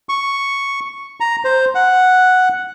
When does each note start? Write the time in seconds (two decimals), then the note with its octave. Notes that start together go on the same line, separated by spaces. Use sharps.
0.09 C#6
1.20 A#5
1.45 C5
1.75 F#5